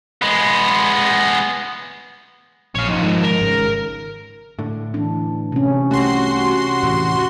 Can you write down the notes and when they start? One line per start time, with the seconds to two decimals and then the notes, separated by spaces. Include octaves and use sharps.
0.22 G#3 B3
2.75 A#1 C#5 F5
2.88 F3 D#4
3.02 G#2 D#3
3.23 A#4
3.41 G#1 G#2 C#3
4.59 A2 D3
4.94 E3 D4
5.52 C3 C#4
5.91 C2 A3 F#4 G4 C6
6.83 E2 A2 E3